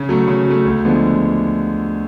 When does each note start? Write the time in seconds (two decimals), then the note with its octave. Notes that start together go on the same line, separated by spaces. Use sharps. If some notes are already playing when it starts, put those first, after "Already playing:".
Already playing: C#3
0.09 F#3 A3
0.28 C#3
0.46 F#3 A3
0.65 D2
0.85 D3 F3 G#3 B3